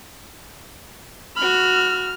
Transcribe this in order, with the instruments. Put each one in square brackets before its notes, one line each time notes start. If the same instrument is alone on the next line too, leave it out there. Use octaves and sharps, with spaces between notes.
[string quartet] F#4 B5 [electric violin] F6